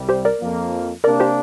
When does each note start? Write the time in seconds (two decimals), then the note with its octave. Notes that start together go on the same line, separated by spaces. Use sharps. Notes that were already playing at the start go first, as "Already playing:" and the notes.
Already playing: C2 C3 G3
0.09 G4 C5
0.25 A#4 D5
0.41 F2 F3 A#3
1.04 C3 A#3 D4 A#4 D5
1.20 G4 C5